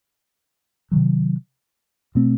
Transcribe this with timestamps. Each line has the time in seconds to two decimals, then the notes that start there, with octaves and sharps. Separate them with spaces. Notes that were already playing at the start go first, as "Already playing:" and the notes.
0.91 C3 D#3 F#3
2.15 B2 A3 C4